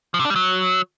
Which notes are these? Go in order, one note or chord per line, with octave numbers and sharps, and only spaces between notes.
F3
C3
D4
G3
F#3